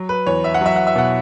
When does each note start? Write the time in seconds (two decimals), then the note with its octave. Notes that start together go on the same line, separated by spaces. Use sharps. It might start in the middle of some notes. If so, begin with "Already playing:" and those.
Already playing: F#3
0.09 B4
0.26 E2 C#5
0.44 E5
0.54 F#5
0.61 F#3 E5
0.76 F#5
0.87 E5
0.96 B2 F#5